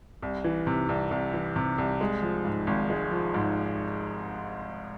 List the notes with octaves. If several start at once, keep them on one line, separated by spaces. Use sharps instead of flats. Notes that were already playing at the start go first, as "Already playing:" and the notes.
C2
E3
C3
C2
C2
E3
C3
C2
G#3
F3
G#2
G#1
G#3
F3
G#2